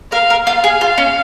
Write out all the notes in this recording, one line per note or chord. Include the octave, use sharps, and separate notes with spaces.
A#4 F5
A#4
F4 F5
G#4
F4
C#4